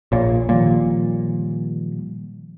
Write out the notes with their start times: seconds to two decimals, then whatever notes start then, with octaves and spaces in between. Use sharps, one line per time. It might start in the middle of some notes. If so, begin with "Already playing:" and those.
0.12 A#1 A#2 C#5
0.49 A#2 D#3 F3 G3